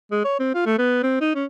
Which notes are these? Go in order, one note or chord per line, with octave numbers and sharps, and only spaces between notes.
G#3
C#5
C4
F4
A3
B3
C4
D#4
C#4